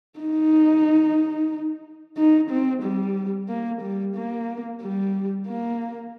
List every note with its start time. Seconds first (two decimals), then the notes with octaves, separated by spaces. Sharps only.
0.19 D#4
2.17 D#4
2.50 C4
2.83 G3
3.48 A#3
3.81 G3
4.15 A#3
4.81 G3
5.47 A#3